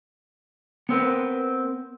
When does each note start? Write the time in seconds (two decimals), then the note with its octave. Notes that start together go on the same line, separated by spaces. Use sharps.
0.89 B3 C4 A#4 B4